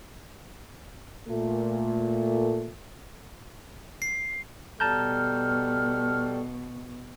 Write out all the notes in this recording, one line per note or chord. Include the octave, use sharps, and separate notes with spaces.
A#2 A3
C7
B2 G3 A4 A5 A#5 F6 G6